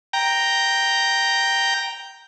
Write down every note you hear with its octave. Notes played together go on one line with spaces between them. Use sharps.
G5 A#5